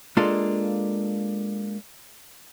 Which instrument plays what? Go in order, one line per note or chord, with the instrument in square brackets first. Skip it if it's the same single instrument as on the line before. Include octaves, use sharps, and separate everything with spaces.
[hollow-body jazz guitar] G#3 A#3 D4 F4 A4